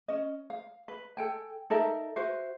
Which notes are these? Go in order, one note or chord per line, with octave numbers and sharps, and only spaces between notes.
C#4 D#5
F5
B4
A4 G5 G#5
D#4 A4 A#4 E5
F#4 B4 C5 E5